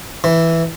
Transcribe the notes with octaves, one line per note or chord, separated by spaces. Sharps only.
E3